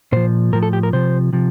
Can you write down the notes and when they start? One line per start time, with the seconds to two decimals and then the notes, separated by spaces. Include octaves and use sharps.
0.12 A#2 F3 C5
0.53 A2 F3 A#4
0.63 A4
0.73 G4
0.83 A#4
0.93 C3 F3 C5
1.33 C3 F3